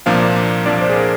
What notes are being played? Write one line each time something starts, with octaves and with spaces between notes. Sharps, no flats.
C2 A#2 F3 A#3 D4 F5
C2 A#2 F3 A#3 D4 D5
C5
G#4
A#4